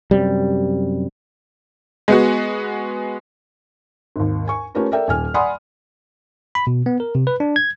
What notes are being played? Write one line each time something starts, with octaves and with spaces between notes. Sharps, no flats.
F#2 C3 G3
G#3 B3 F#4
G#1 D#2
G#5 C#6
A3 C#4 F4 G4 A#4 B4
A4 A#4 D5 E5 G5
D#1 G#5 F6
D5 F#5 G#5 B5 C6 D#6
B5
B2
B3
A#4
C3
B4
D4
G#6